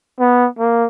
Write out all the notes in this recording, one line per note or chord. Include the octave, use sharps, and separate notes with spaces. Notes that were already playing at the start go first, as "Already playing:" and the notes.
B3
A#3